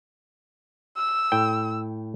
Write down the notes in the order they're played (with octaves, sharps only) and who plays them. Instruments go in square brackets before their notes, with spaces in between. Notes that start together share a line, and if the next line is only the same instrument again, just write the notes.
[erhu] E6
[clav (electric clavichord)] A2 G5